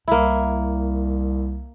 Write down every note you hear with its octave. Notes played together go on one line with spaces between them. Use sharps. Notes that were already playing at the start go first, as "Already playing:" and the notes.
C2 A#3 E4